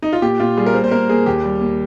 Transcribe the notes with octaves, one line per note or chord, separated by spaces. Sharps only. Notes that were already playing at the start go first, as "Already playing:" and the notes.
D#4
F4
A#2 G4
A#2 F4
G3 G#4
A#4
A#3 C5
C5
A#3 A#4
A#3 G#4
D#2 G4
G3
A#3